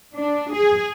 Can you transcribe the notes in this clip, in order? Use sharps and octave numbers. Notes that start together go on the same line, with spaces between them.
D4
G#4